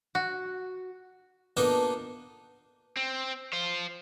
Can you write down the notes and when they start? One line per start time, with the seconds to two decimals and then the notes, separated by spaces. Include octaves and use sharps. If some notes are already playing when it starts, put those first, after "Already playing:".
0.15 F#4
1.57 A#3 B3 D4 D#4 F4 A4
2.97 C4
3.53 C5 F5